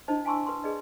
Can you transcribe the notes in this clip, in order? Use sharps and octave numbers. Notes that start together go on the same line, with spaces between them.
D4 E4 C5 D#5 A5
F5 G#5 A5 C6 C#6 E6
B4 C6
G#4 B4 D5 D#5